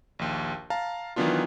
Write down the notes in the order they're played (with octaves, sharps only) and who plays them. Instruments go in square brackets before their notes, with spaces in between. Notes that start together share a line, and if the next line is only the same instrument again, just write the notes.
[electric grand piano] A#1 D#2
F5 A5 A#5
D#3 E3 F#3 B3 D4 F4